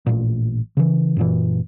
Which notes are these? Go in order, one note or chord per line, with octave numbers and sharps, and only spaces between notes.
A1 A#2
C#3 E3
F#2 A#2 E3